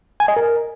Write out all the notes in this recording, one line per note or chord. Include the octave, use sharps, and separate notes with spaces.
G#5
D#5
A#4